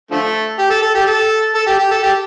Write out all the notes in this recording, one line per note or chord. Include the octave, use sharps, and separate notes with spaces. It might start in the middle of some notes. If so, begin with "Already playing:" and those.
D3 F3 A3
G4
A4
A4
G4
A4
A4
G4
G4
A4
G4